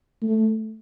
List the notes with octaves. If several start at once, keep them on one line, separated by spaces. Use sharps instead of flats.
A3